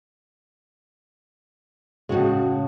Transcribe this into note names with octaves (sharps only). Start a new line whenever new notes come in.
A2 C#3 G#3 F#4 F#5